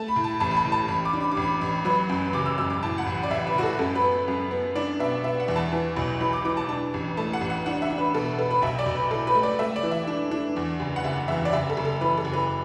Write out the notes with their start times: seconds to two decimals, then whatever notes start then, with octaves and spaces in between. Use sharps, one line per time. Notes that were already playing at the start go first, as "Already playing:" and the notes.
Already playing: A3 A5
0.08 B5
0.16 A2
0.24 A5
0.40 A1 A5
0.51 B5
0.57 A5
0.65 A2
0.72 A5
0.88 A1 B5
1.05 D6
1.13 D4
1.21 B5
1.32 D6
1.37 A1 B5
1.61 A1
1.85 F#3 B4
2.09 F#2
2.33 F#1 D6
2.46 E6
2.58 F#2 E6
2.70 D6
2.83 A2 A5
2.98 F#5
3.06 A1
3.23 D5
3.31 A1 E5
3.47 B4
3.55 A2 F#4
3.63 A4
3.79 F#2 A4
3.95 B4
4.03 B3
4.28 F#2
4.51 B3
4.76 D4 D5
4.99 B2 E5
5.24 B3 E5
5.40 F#5
5.48 E2
5.56 A5
5.73 E3
5.97 B1
6.21 E3 B5
6.33 D6
6.45 E3 D6
6.57 A5
6.68 D4 A5
6.94 A1
7.17 A3 A5
7.33 F#5
7.41 A1
7.50 F#5
7.66 D4 F#5
7.82 E5
7.90 D4
7.98 B4
8.14 B2 A4
8.38 B3 A4
8.51 B4
8.62 B1 E5
8.79 D5
8.86 B1
8.95 B4
9.11 A2 A4
9.27 B4
9.35 A3
9.43 D5
9.59 A3 E5
9.76 D5
9.83 E3
9.91 E5
10.07 D4
10.31 D4
10.56 E2
10.80 F#1
10.96 F#5
11.04 F#1 E5
11.28 E2 E5
11.45 D5
11.53 F#1 E5
11.69 A4
11.77 F#1
11.85 A4
12.01 E3 B4
12.17 A4
12.25 F#1
12.33 B4